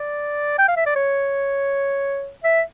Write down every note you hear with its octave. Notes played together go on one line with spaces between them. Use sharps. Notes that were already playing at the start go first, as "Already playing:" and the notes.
Already playing: D5
G5
F5
E5
D5
C#5
E5